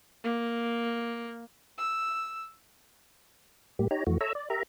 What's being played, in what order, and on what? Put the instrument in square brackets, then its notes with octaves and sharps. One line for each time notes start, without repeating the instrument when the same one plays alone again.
[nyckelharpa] A#3
[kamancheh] E6
[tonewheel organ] A2 G3 A#3 G4
D#4 G4 C#5 A#5
F2 E3 A3 F#4
A4 C#5 E5 A#5 E6
D5
G4 A#4 E5 A#5